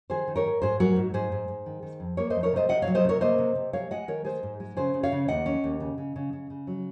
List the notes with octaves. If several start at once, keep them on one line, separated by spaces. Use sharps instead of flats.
D#3 G#4 C5
D#3
A#4 C#5
G#2
G#2 G#4 C5
F#3 F#4 A#4
G#2
G#2 G#4 C5
G#2
G#2
D#3
D#3
F2
A#3 A#4 C#5
F2 C5 D#5
A#4 C#5
C3 C5 D#5
C3 D#5 F#5
C#5 F5
F#3
C5 D#5
C3 A#4 C#5
A#3 C5 D#5
C3
C3
G#3 C#5 F5
G#3 D#5 F#5
D#3 A#4 C#5
G#3 G#4 C5
G#2
G#3
C#3 G#4 C5
C#3
C#5 F5
C#3
D#2 D#5 F#5
C#4
D#2
C#3
C#3
C#3
C#3
C#3
F#3